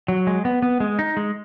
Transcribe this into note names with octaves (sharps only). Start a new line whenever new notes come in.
F#3
G#3
B3
B3
G#3
D#4
G#3